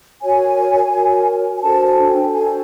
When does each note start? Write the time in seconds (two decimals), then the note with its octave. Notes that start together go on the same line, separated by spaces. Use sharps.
0.22 F#4 A#4 C#5 G#5
0.92 F#4 A#4 C#5
1.57 G#5
1.63 D4 F#4 A4 C5 A5
1.86 G#5
2.09 G5
2.33 D4 F#4 A4 C5 G#5